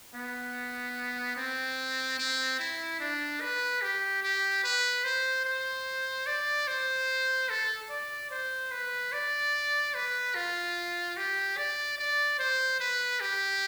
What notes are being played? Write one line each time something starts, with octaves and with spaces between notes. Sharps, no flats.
B3
C4
C4
E4
D4
B4
G4
G4
B4
C5
C5
D5
C5
A4
D5
C5
B4
D5
B4
F4
G4
D5
D5
C5
B4
G4